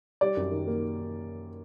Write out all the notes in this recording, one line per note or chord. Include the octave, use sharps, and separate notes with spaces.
G3 D5
F#2
D#3
A#3